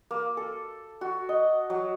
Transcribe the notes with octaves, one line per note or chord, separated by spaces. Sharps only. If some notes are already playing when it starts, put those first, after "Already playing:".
A#3
A4
F#4
D#5
F#3